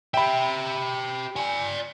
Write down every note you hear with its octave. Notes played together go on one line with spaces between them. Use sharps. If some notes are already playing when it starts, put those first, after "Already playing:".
G4 E5 G5 B5
D5 G#5